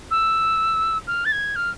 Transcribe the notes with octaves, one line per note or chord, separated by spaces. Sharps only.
E6
F6
A6
G#6
F6